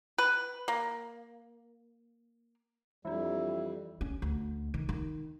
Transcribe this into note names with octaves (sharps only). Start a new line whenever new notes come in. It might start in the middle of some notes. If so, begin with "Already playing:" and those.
B4
A#3
F2 E3 G3 D4 E4
C#4
D2
D#3
D#3